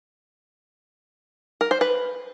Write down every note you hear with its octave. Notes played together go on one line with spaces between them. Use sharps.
A#4
C5
B4